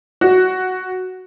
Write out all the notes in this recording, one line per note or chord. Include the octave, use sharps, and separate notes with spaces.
F#4